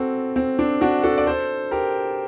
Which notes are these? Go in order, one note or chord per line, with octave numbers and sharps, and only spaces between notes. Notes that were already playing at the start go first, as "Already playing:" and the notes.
Already playing: C4 F#4 A4
C4
D4
D4 F#4
F#4 A4
D5
A4 C5
G4 A#4